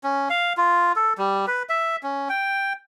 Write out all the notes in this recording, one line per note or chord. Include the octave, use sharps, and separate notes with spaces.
C#4
F5
F4
A4
G3
B4
E5
C#4
G5